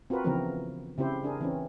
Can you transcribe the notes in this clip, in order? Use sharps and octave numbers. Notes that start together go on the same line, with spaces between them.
C4 F4 F#4 A#4 B4
C#3 E3 F3 B3 C4 A#4
C#3 C4 E4 G4 C5
D4 G#4 A#4
E3 C4 C#4